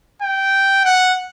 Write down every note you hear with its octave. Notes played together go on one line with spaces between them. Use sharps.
G5
F#5